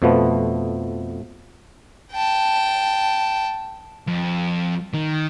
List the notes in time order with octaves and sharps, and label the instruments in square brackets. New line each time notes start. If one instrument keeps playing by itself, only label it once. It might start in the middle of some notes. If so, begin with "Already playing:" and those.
[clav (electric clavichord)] F2 B2 F3 A3 B3
[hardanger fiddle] G5 A5
[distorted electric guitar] F2
D#3